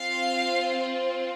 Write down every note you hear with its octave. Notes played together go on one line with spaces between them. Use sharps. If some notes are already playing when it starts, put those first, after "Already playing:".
Already playing: C4 F4 F5